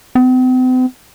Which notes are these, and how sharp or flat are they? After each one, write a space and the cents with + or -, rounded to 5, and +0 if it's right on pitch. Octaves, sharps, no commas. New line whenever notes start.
C4 -45